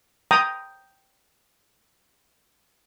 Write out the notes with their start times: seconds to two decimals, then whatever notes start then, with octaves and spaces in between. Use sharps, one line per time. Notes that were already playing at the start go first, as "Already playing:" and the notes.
0.31 G5 A#5 D#6